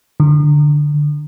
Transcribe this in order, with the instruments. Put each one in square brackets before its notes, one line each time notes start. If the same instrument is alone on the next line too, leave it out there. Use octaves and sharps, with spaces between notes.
[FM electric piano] D3